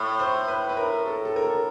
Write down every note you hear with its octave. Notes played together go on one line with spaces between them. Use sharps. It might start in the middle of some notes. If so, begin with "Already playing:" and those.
Already playing: A2
C5
B4
B4
A#4
A4
A4
A#4
A4